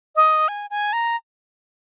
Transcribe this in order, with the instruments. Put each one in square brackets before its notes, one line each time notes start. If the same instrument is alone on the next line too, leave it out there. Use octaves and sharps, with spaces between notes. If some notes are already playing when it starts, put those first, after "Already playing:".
[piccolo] D#5
G#5
G#5
A#5